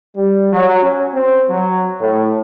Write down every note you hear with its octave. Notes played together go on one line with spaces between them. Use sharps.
G3
F#3
C#4
C4
F#3
A2